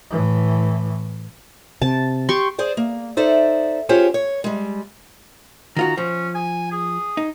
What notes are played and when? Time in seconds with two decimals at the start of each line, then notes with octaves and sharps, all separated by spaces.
0.11 A2 E3
1.82 C3 A5
2.29 G4 C6 C#6
2.58 G#4 C5 D5
2.77 A#3
3.17 D#4 A4 C5 D5 E5
3.89 C#4 F4 G4 G#4 C5 C#5
4.14 C#5
4.44 G3 G#3
5.77 D#3 F4 F#4 A#5
5.97 F3 C#4
6.34 G#5
6.72 G#4
7.17 D#4